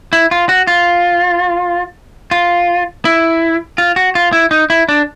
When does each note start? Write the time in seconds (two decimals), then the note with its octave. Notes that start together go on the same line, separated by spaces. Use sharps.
0.13 E4
0.31 F4
0.49 F#4
0.67 F4
2.31 F4
3.05 E4
3.78 F4
3.96 F#4
4.15 F4
4.33 E4
4.51 D#4
4.70 E4
4.89 D4